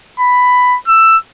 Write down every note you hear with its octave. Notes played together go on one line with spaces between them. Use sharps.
B5
E6